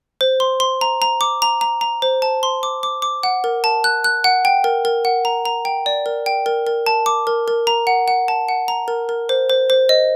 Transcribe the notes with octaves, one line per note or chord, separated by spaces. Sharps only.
C5
C6
C6
A#5
A#5
D6
A#5
A#5
A#5
C5
A5
C6
D6
D6
D6
F#5
A#4
A5
F#6
F#6
F#5
G5
A#4
A#4
F#5
A#5
A#5
G5
D5
A#4
G5
A#4
A#4
A5
D6
A#4
A#4
A#5
F#5
F#5
A5
F#5
A#5
A#4
A#4
C5
C5
C5
D#5